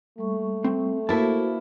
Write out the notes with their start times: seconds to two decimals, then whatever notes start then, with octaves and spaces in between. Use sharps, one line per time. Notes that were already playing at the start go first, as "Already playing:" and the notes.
0.18 G3 A3 A#3 C#6
0.64 C4
1.09 A#3 E4 F#4 B4 C5 E5 A5